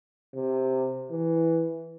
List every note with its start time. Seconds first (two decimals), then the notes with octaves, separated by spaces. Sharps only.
0.35 C3
1.11 E3